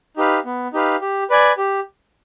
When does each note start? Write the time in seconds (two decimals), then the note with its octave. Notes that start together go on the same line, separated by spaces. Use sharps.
0.17 D#4 G4 B4 F5
0.45 B3
0.73 D#4 G4 B4 F5
1.01 G4
1.30 B4 D5 G#5
1.58 G4